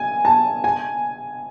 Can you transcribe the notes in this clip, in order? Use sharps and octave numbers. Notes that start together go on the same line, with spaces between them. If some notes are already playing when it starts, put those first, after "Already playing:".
Already playing: G#5
A5
G#5